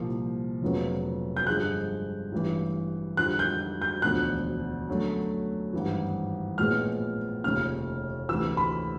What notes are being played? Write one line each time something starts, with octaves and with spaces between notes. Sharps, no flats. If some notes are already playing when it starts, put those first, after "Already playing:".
Already playing: C2 A#2 F3 A#3
F1 F2 C#3 F#3 B3
G6
G2 D3 F3 G#3 F#6
A1 G2 E3
F2 D3 G3 F#6
G6
G6
E1 D2 D3 F3 F#6
F#2 D3 F#3 A3
G#1 G2 E3
A#1 A2 F3 G#3 B3 F6
F1 D#2 C#3 F6
D2 C3 E3 E6
B5